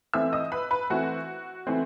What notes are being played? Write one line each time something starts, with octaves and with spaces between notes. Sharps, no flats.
E3 A3 C4 E5 E6
D#5 D#6
B4 B5
B4 B5
E3 A3 C4 F#4 F#5
E3 A3 C4